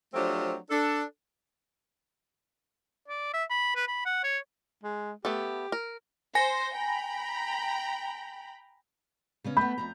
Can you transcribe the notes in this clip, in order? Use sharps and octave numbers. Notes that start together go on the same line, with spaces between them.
F3 F#3 A3 C4 D4 G4
D4 A4
D5
E5
B5
B4
B5
F#5
C#5
G#3
A3 B3 G4 A4
A#4
C5 G#5 A#6
G5 A#5 B5
C#3 B3 C#4
A3 B3 B5 G6
F2 G#2 A#5